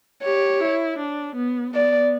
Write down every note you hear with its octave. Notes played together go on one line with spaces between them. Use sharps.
G4 C#5
E4
D4
B3
B3 D5